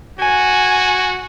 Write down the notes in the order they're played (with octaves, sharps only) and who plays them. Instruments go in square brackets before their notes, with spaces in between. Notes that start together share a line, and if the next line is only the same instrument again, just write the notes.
[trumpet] F#4 [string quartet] G#5